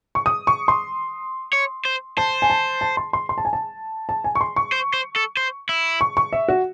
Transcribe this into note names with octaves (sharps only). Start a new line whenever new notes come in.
C#6
D#6
C#6
C6
C#5
C5
C5 A5
G#5
A5
A5
C6
C6
C6
A5
G#5
A5
A5
G#5
C#6
C6
C#6
C5
C5
A4
C5
E4
C#6
C#6
E5
F#4